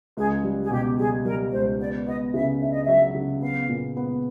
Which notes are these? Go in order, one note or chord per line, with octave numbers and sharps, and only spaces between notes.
C#2 G#4
G3
G#4
B2 G4
G3 G#4
G3 A#4
C#2 C5
B3 D5
B3 D#5
C#3 E5
D4 E5
D#5
E5
F#3
C#3
B3 F5
A#2
B3